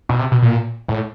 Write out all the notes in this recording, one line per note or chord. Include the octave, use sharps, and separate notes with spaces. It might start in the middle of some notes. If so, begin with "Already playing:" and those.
B2
C3
B2
A#2
A2